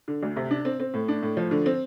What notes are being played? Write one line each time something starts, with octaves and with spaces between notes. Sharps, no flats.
D3
D2
C3
D4
C4
C4
A2
D4
A2
F3
D3
C4